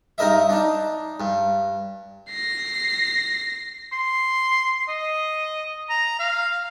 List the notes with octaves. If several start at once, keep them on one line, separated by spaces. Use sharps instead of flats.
G2 D#4 A#4 D#5 E5
D4 D#4
G2
A#6 C7
C6
D#5
A#5
F5